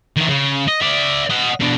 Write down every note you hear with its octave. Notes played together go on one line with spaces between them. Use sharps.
D#3 E3
C#3
D#5
D5 E5
D#5 F#5
B2 D4